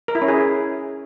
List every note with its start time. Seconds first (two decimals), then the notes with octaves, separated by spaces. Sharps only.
0.08 A#4
0.15 E4
0.22 C#4
0.28 G#4